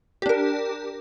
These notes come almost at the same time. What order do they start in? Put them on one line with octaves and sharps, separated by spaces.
G4 D4 A#4